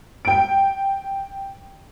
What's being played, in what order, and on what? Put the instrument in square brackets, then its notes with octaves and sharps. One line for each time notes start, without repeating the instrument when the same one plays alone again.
[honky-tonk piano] G5 D7